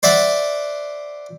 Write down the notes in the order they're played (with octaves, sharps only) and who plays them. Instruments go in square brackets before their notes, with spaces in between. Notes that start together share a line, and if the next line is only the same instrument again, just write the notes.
[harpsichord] C5 D5 E5 F#5 C6